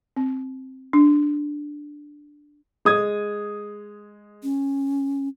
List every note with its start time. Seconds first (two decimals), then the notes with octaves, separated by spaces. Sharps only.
0.17 C4
0.93 D4
2.85 G#3 D#6 G#6
4.43 C#4